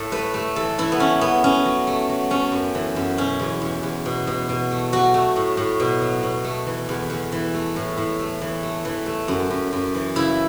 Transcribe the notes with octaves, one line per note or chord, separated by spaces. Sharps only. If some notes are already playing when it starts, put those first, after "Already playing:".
Already playing: A2 A4
A3 B4
A3
E3 A4
E3 E4
B3
A3 C#4
E2 B3
F#3 C#4
F#3
A3
F#3
A3 C#4
F#2
E3
F#2
B2 C#4
E2
E2
E2
B2
B2
B2
A3
F#3 F#4
A3
A2
A2
B2
F#3
B2
A3
E3
E2
E2
E3
A3
A2
A2
A3
E3
A3
E3
A3
F#2
F#2
F#2
E3
C#3 E4